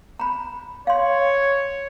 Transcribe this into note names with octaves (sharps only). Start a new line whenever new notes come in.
A#5 B5
C#5 F5 C6